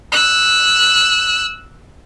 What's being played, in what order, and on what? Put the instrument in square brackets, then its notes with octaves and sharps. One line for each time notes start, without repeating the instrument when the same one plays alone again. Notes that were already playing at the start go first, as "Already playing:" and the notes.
[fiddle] E6 F#6